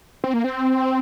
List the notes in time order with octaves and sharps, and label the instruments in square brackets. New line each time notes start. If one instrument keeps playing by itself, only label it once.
[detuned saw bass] C4
A#3
C4